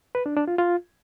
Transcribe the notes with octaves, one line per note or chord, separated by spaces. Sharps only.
B4
D4
D4
F4
F4